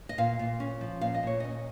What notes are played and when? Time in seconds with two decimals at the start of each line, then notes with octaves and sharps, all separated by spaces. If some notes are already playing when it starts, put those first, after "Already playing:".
0.09 D#5
0.18 A#2 F5
0.39 A#2
0.60 C#4
0.81 F3
1.01 A#2 F5
1.14 D#5
1.23 A#2 C#5
1.40 C#4 D#5